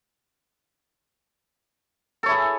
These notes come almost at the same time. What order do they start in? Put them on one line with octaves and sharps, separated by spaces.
A4 C#5 E4 G#4